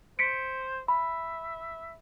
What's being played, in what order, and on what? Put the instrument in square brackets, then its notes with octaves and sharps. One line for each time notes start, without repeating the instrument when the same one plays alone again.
[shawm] C5 [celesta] B6 C#7 D7
[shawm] E5 [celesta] B5